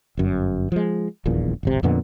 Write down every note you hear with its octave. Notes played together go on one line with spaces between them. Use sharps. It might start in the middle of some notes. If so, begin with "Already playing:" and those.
G1 F#2
F3 G#3
D#1 A#1 E2 A#2
D1 G#1 C3
F2 A#2 D3 B3